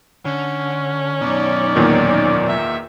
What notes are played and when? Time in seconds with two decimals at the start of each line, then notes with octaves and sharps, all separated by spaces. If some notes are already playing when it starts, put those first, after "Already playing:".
0.25 D3 C#4
1.21 F#2 B2 D#4 D5
1.76 E2 A#2 D#3
2.47 E5